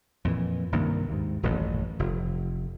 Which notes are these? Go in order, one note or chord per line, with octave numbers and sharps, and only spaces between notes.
F2 A#2 E3
C2 G2 D#3 A#3
D#2 G#2
D#1 A1 F#2
F1